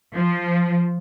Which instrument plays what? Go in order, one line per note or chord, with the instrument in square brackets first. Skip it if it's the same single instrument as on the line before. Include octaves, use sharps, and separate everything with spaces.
[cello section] F3